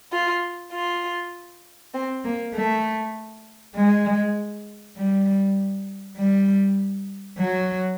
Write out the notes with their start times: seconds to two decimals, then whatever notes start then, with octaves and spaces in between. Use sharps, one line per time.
0.12 F4
0.72 F4
1.94 C4
2.24 A#3
2.54 A3
3.74 G#3
4.96 G3
6.16 G3
7.38 F#3